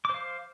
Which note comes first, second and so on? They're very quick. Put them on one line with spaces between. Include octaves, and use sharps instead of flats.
D6 C5 F5